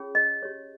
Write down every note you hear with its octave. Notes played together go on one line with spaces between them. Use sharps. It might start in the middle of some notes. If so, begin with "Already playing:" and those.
Already playing: C#4 F4 G#4 C#5
D#5
G4 C#5